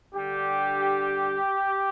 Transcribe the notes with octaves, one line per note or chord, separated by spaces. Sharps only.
D3 G3 D4 G4